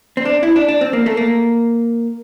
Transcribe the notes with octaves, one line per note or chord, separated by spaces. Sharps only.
C4
D4
E4
D4
D4
C4
A#3
A3
A#3